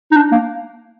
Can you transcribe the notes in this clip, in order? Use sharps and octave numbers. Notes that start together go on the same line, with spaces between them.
D#4
D4
A#3